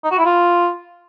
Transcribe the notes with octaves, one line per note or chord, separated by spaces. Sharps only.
D#4
F#4
E4
F4